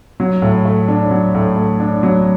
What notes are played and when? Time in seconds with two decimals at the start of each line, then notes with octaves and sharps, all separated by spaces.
0.20 F#3
0.42 A2
0.65 A3
0.88 D4
1.11 F#3
1.35 A2
1.56 A3
1.80 D4
2.03 F#3